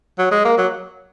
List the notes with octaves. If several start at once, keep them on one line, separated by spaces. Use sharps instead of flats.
F#3
G#3
A#3
F#3